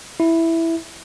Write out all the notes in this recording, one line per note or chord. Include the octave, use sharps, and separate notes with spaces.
E4